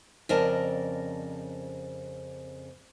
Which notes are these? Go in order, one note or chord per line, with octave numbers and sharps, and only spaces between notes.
F2 C#3 A#4 D5 D#5 A5